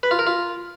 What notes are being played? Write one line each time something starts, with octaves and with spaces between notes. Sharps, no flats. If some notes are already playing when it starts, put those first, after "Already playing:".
B4
F4
A#4
F4